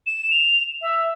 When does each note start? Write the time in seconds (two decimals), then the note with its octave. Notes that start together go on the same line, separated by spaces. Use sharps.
0.07 E7
0.31 F7
0.81 E5